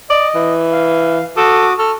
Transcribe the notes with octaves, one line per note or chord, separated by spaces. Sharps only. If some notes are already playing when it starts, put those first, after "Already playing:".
D5 D#5
E3
F5
F#4 A4 D6 D#6
A4 C#6 F6